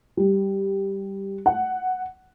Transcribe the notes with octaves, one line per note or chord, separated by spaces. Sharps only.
G3
F#5